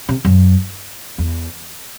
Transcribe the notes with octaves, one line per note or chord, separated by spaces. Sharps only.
C3
F#2
E2